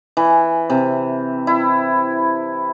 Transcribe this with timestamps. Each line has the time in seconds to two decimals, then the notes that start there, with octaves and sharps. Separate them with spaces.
0.17 E3
0.70 C3
1.47 E4